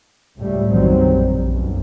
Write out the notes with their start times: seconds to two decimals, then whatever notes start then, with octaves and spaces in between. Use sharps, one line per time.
0.38 C#2 A2 G3 A3
0.70 B1 F#2 D#3 F#3 G3 C4
1.13 A#1
1.51 B1 F#2